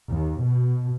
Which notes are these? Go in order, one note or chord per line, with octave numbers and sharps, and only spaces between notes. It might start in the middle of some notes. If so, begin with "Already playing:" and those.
D#2
B2